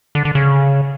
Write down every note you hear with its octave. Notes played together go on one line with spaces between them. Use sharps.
D3
D3
C#3